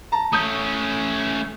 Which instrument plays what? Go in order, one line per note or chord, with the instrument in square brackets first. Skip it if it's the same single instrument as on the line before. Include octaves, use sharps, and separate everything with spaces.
[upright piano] A5 A#5
[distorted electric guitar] A3 C#4 [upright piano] D#6 G6